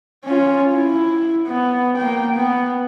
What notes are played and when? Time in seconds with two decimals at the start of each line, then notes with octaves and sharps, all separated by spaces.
0.24 C#4 F4
0.73 E4
1.46 B3
1.97 A#3 G5
2.36 B3